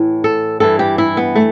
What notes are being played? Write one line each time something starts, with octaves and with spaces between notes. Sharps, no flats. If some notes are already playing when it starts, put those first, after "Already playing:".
Already playing: A2 E3
A4
G2 E3 A4
G4
E4
B3
A3